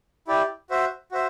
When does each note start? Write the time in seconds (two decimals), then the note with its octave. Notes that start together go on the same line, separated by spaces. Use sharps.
0.27 E4 G4 D5
0.70 F#4 C5 E5
1.12 F#4 C5 E5